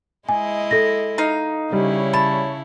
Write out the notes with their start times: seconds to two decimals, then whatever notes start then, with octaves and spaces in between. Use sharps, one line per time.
0.29 G#3 E4 D#5 G#5
0.71 A4 A#6
1.18 D#4 F5
1.73 C#3 G3 E4 C#5
2.13 A5 B5